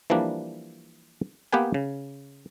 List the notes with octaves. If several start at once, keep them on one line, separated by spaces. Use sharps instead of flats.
E3 F3 G3 A#3 D4
A#3 B3 G4 B4 G5 G#5
C#3